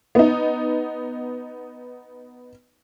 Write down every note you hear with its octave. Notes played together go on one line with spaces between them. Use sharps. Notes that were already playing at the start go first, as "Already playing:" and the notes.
B3 D#4